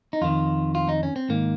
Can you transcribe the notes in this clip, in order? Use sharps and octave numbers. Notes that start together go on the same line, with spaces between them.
D#4
F2 D#3 F4
F4
D#4
C#4
C4
G#2 D#3 A#3